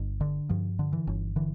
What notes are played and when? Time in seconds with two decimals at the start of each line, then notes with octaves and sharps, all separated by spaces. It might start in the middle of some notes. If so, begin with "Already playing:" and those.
Already playing: G1
0.21 D3
0.49 G2 F3
0.79 D3
0.93 E3
1.07 G1
1.36 D3 E3